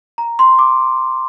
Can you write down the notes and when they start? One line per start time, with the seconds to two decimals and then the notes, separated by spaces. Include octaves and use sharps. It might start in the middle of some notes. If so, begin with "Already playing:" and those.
0.18 A#5
0.39 C6
0.59 D6